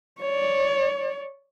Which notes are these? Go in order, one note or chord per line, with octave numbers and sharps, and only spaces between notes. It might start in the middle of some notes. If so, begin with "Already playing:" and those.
C#5 D5